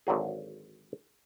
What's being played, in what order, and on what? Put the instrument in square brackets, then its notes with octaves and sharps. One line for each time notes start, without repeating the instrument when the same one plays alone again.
[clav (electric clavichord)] G#1 D3 F#3 G#4